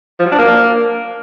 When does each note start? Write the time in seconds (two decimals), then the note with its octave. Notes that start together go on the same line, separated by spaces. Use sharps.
0.20 F3
0.26 F#3
0.32 D4
0.39 A#3